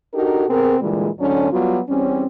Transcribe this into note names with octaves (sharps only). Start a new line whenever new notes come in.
D4 D#4 F#4 G4 A4 A#4
C3 B3 C4 G#4 A#4
A#2 D3 E3 G3 G#3
D2 G#2 D3 F#3 C#4 D4
F#3 G3 B3 F4 F#4
E2 G3 C4 C#4